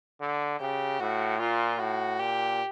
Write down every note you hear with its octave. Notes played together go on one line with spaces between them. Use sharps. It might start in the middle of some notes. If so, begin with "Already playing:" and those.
D3
C#3 G4
A2 F#4
A#2 F4
A2 F#4
A#2 G4